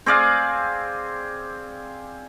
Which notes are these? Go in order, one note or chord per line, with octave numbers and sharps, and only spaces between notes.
C4 G#4 D5 F5